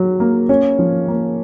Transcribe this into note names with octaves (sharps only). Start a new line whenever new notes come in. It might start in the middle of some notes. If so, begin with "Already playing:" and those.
Already playing: F#3
A#3
C#4
F3
A#3